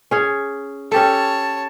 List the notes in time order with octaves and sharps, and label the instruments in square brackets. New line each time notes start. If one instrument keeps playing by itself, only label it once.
[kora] C#4 G#4 C#5
[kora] C#4 G4 A4 [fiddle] C#5 A5